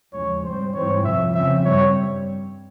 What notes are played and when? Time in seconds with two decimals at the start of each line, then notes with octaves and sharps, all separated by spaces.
0.13 E2 C#3 F3 G#3 C#5
0.43 G#2 G3 C4 C5
0.73 G#2 E3 G3 C4 C#5
1.04 F2 C3 F3 E5
1.34 C#3 F3 C4 E5
1.65 G2 G3 C4 C#5